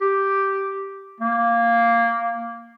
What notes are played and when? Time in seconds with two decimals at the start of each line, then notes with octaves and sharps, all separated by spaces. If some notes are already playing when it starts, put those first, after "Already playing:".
0.01 G4
1.21 A#3